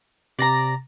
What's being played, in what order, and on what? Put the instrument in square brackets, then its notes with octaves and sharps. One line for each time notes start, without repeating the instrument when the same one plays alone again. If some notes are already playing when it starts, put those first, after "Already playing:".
[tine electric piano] C3 A#6 [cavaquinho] D5 A#5